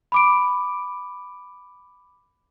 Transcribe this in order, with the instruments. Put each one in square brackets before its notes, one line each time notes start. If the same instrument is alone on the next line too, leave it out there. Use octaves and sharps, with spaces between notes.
[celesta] B5 D6 D7